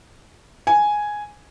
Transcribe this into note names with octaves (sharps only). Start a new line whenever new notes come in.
G#5